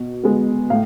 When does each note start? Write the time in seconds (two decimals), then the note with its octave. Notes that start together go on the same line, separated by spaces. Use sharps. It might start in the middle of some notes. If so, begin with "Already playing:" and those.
Already playing: B2
0.23 G#3 B3
0.70 A2 F5